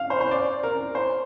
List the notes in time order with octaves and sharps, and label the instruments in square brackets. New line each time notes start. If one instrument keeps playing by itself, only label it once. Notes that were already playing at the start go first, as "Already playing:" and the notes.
Already playing: [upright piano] F5
C5
C5
D5
A#4
C5